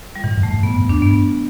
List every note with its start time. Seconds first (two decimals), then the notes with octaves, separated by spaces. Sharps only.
0.15 G3
0.24 A2 E3
0.37 G2
0.43 A3
0.50 G2
0.63 A2 B3
0.76 G2
0.89 E2 D4
1.02 G2 B3